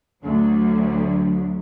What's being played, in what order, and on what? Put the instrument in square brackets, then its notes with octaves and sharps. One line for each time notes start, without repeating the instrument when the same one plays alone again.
[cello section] D2 F#3